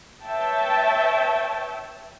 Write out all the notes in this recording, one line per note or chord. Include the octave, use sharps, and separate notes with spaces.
B4 C#5 E5 G5 A5